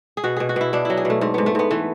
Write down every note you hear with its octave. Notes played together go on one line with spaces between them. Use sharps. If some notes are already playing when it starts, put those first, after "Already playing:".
G#4
B2 F#4
B2 G#4
F#4
B2 E4
B2 D4
F#3 E4
G#4
B2 A3
G#2 A3
G#2 B3
A3
G#2 B3
E3 A3